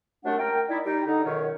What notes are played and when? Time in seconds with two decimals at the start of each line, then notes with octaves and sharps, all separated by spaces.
0.24 C2 F#2 A3 D4 F#4 F#5
0.39 A#4 G5
0.69 D#4 E4 D5
0.85 G3 D#4 G5
1.07 D3 D#4
1.25 C#2 F#2 B2 D#3 C#5